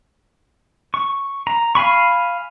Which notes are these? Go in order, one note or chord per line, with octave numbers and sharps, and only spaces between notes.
C#6
A#5
F5 G#5 B5 C#6